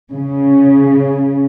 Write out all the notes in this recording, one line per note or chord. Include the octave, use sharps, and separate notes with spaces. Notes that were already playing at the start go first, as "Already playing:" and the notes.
C#3